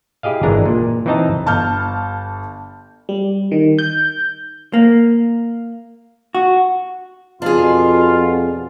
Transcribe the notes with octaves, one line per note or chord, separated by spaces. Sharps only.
E4 G4 G#4 D#5 F5
G#1 E3 G#3 D4 A#5
A#2
E3 C4 D#4 D#5 A5 A#5
G1 A5 F6 G6
G3
D#3
G6
A#3
F#4
F2 B2 D4 F4 G#4